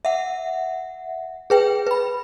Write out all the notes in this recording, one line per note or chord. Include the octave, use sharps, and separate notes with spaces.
E5 F#5
G#4 B4 G5
B4 B5